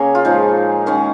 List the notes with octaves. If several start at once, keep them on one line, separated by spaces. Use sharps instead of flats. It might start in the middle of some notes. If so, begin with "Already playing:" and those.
Already playing: C#3 A#3 C#4 G#4 A#4 C#5
F4
A#2 F3 G#3 D#4
D#3 G#3 C#4